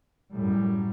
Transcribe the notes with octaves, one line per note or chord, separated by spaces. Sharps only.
F#2 A2 G3